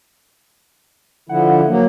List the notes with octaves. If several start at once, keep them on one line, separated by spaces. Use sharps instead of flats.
D3 F3 E4 F#5
F#3 A#3